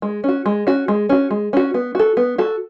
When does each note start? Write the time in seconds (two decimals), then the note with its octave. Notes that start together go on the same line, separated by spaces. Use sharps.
0.02 G#3
0.24 C#4 F#4
0.46 G#3
0.67 C#4 F#4
0.88 G#3
1.09 C#4 F#4
1.31 G#3
1.53 C#4 F#4
1.74 B3
1.95 F#4 A4
2.17 B3
2.38 F#4 A4